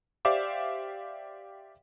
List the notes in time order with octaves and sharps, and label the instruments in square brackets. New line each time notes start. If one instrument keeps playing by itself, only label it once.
[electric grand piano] G4 C5 D5 E5 F5 D6